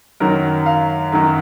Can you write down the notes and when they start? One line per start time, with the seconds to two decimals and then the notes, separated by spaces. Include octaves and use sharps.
0.20 F#2 D#3 F#3 A#4
0.66 F5
1.12 F#2 D#3 F#3